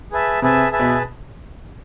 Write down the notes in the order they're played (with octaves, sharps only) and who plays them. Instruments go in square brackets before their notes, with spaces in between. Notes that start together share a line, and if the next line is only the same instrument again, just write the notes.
[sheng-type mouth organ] G#4 B4 E5 A5
[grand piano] C3 [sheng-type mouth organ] G#4 B4 E5 A5
[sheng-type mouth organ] G#4 B4 E5 A5
[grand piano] B2